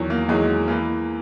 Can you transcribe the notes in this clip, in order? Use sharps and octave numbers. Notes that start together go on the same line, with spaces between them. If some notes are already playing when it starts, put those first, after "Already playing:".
Already playing: E2 D#3 F#3
A#3
E2 D#3 F#3 G#3
E3 A#3